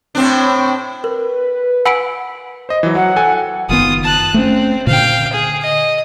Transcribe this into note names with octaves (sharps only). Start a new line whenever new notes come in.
A2 C4 D4
A#4 B4
F#5 G#5 B5 E6 B6 D7
C5 D#5
E3 F#3
F#3 F#5
A4 G5 G#5
F#1 D#3 B3 F4 D#6
A5 F#6
A3 C4 C#4
A#2 D3 F5 G5
G#4
D#5